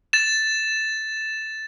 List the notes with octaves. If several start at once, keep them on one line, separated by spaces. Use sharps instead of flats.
A6 E7